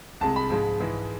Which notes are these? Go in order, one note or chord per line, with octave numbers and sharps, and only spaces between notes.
C2 C3 G#3 A5
B5
G#2 F3 G#3
G#2 E3 G#3